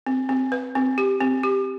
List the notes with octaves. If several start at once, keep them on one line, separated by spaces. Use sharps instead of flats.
C4
C4
B4
C4
G4
C4
G4